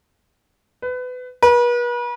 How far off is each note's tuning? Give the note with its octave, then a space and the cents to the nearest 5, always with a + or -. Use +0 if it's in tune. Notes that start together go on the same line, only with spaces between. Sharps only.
B4 +25
B4 -40